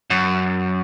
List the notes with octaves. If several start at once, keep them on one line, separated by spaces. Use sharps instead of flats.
F#2